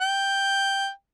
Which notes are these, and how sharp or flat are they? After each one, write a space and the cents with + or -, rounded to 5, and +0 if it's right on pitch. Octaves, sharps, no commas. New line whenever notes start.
G5 +5